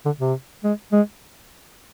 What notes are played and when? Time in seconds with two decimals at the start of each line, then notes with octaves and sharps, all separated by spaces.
0.06 D3
0.20 C3
0.64 G#3
0.93 G#3